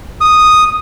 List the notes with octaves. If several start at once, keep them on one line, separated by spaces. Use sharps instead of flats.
D#6